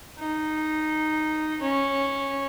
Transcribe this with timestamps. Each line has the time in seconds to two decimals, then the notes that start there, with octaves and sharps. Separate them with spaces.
0.20 D#4
1.62 C#4